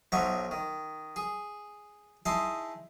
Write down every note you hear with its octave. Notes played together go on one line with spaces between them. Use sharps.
B1 F3 F#3 D#4 E5 C#6
D#3
G#4
D#4 E4 G#4 A5 C6